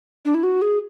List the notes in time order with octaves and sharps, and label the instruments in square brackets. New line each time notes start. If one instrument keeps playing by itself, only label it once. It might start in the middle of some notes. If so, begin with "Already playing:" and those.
[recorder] D4
E4
F#4
G#4